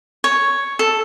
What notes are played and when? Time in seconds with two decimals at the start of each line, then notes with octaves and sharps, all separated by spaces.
0.24 C#5
0.79 A4